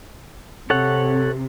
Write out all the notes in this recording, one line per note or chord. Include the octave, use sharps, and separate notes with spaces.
C3 A4 C#5 F#5